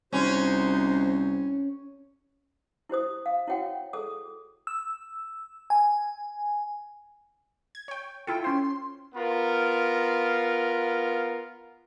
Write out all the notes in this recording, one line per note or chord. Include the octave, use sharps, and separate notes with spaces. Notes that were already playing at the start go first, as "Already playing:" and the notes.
C2 C#4 D#4 F#4 C5
E4 G4 C5 D#6
F5
E4 F#4 C#5 F#5 G5
G#4 A4 D#6
E6
G#5
G#6
C#5 G5
E4 F4 A4 G5
C#4 C5 C6
B3 F4 A#4